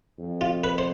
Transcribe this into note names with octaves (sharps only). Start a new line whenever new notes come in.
F2
F4
B4
C5